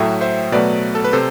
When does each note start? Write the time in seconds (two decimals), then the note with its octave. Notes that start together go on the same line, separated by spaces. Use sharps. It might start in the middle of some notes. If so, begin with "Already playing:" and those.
Already playing: A2 F#3 A3 E5 G5
0.21 C5 E5
0.52 B2 F#3 A3 B4 D5
0.95 A4
1.04 B4
1.13 C3 A4 C5